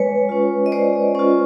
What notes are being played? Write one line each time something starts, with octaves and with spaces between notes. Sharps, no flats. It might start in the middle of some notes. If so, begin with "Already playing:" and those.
Already playing: G#3 B4 C#5
C#4 F4
D#5
G#3 C5 D5
C#4 F4